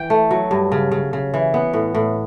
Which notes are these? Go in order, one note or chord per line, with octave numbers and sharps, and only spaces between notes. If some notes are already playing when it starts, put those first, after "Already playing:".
Already playing: E3 G5
A3
F#3
G2
C#3
C#3
C#3
E3
B3
A2
A2